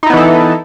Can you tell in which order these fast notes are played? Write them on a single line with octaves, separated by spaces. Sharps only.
D#4 E4 B3 E3 A4